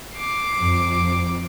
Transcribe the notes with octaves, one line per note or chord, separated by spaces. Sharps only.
D6 C7
F2